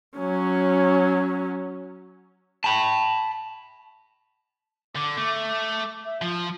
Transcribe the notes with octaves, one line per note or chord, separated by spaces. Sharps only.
F#3 C#4
A5 B5
D3 D6
A3
D6
E5
F3 F4